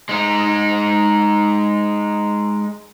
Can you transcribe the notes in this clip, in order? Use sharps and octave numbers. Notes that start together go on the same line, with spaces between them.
G#3 D#4